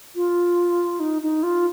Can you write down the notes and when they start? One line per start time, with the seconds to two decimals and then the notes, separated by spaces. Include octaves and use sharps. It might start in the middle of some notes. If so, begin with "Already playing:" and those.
0.15 F4
1.00 D#4
1.22 D#4
1.43 F4